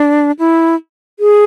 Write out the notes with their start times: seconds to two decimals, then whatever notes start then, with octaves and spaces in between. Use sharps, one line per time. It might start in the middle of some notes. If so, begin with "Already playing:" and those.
Already playing: D4
0.39 E4
1.20 G#4